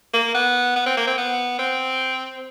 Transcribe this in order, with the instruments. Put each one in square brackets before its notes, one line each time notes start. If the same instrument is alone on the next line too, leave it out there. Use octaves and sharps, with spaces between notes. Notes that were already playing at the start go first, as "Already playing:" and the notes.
[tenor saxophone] A#3
B3
B3
C4
A#3
C4
B3
C4